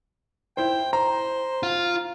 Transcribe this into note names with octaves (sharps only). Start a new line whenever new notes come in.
E4 C5 G5
C5 A#5
F4